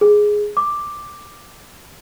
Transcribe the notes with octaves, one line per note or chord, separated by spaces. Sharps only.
G#4
D6